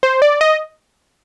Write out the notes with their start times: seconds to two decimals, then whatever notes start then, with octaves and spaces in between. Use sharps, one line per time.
0.03 C5
0.22 D5
0.41 D#5